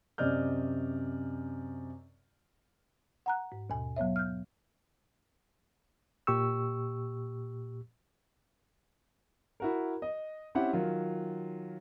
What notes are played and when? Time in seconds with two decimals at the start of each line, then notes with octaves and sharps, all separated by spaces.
0.18 F#2 C3 D5 D#5 F6 G6
3.26 F#5 A#5 F#6
3.52 G#2
3.70 D#2 B2 G#5
3.96 F#3 B3 C#5 E5
4.16 F6 G6
6.27 A#2 G4 C#6 E6
9.60 E4 F#4 A#4
10.02 D#5
10.55 C4 C#4 E4 G4 E5 F#5
10.73 D#3 F#3 F4